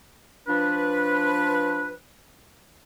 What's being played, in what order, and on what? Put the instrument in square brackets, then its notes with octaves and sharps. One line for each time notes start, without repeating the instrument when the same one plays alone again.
[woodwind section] F3 D4 B4